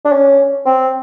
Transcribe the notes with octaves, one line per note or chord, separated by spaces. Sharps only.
D4
C#4
C4